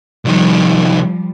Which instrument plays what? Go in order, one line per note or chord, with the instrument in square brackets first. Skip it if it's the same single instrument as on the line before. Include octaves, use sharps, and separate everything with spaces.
[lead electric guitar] C2 D#3 [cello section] F3 G3